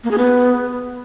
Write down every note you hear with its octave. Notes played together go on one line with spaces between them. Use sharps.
A#3
G#4
B3